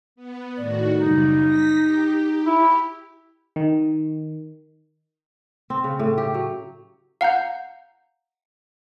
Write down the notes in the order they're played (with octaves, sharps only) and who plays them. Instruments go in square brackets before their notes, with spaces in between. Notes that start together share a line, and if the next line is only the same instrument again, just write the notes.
[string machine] B3
[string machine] A2 D#3 F#4 [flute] D5
[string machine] F#2 C#3 G3 [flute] D#4
[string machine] A#6 B6
G4
[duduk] E4
[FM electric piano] D#3
[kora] C4
C#3
A2
G4
F#3
[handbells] F5 F#5 A#5 G6